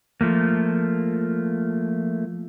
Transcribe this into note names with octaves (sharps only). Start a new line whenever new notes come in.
F3 A3 A#3